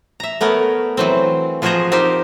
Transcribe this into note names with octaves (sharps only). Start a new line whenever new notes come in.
E5 A#5
A3 B3 A#4 C#5
E3 F#3 C4
F3 F4 F#4 G#4 C5 A#5
C4 D#4 G4 A#4 C5